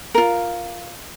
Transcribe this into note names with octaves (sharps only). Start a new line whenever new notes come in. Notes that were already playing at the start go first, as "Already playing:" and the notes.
F4 A#4